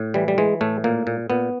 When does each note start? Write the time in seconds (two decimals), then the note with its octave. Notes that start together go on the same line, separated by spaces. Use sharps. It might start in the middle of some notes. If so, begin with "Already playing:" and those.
Already playing: A2
0.14 E3 G3
0.28 G3
0.38 E3 G#3
0.61 A2 A3
0.84 A#2 A#3
1.07 A#2
1.30 A#2 B3